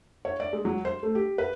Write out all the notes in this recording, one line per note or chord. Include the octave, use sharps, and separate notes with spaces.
C#5
D5
G#3
F#3
C5
A3
G4
B4